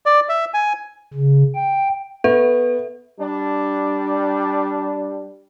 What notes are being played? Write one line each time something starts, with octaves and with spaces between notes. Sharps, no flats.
D5
E5
G#5
C#3
G5
B3 A4 E5
G3 D4